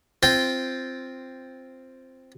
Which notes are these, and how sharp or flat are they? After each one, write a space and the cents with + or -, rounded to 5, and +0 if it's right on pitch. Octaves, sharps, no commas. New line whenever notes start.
C4 +0 F4 -10 G5 +0